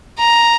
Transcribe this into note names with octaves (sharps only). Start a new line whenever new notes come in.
A#5